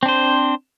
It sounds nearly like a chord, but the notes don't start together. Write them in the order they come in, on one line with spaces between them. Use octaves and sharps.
C4 D4 C5